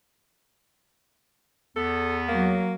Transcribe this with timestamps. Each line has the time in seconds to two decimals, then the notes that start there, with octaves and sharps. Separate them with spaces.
1.76 E2 B3 A4
2.29 F#3 A#3